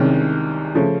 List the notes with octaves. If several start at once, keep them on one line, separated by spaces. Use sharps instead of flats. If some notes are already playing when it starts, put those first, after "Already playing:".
Already playing: C2 C3 D#3 G#3 C#4
C#3 F3 A3 C#4